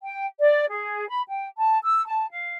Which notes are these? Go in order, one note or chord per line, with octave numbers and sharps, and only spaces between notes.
G5
D5
G#4
B5
G5
A5
E6
A5
F5